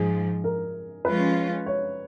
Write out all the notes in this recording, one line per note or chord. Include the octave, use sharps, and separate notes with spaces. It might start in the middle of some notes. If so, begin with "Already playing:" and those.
Already playing: G#2 F3 G#4
A#4
F3 G#3 C#4 F4 B4
C#5